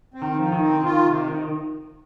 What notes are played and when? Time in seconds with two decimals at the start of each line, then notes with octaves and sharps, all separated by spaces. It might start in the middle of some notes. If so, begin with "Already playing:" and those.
0.14 C4
0.22 D#3
0.38 F3
0.52 D#3
0.61 C4
0.83 D#3 F4
1.07 C3